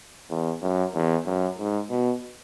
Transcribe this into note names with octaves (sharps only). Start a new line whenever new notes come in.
E2
F#2
E2
F#2
G#2
B2